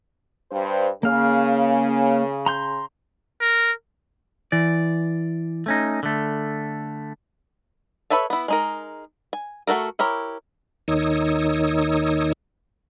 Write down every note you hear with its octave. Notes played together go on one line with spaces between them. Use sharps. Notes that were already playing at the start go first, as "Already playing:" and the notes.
G2 C5
C#3 A#3 F5
A#5 C6 G6
A#4
E3 D5
A3 C#4 D#4
D3 A3
A4 B4 C#5 E5 A5
B3 E4
G#3 D#4 A#4
G#5
A3 F#4 A4 A#4
E4 G4 A#4 C#5
D#2 D#3 D#4 C#5 D#6 E6